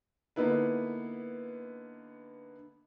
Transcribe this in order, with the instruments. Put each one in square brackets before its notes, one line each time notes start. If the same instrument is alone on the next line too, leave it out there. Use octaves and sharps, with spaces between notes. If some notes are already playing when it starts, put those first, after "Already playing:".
[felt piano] D3 A#3 B3 D#4 E4 B4